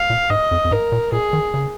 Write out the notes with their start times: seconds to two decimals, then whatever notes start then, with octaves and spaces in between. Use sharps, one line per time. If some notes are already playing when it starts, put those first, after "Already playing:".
Already playing: F5
0.10 A#2
0.30 G#2 D#5
0.51 F2
0.65 F2
0.71 G#2 A#4
0.92 A#2
1.12 A#2 G#4
1.33 D#3
1.54 C#3